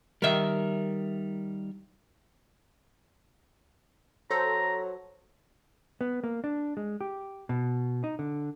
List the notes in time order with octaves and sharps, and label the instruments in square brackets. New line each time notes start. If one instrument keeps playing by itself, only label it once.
[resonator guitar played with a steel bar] D#3 A#4 [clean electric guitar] G3 E5
[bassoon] F#3 [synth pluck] A4 C5 [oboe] A#5
[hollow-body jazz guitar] B3
A#3
D4
G#3
G4
B2
D#4
D3